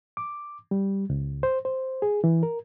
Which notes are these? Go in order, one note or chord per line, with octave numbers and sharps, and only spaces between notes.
D6
G3
C#2
C5
C5
G#4
E3
A#4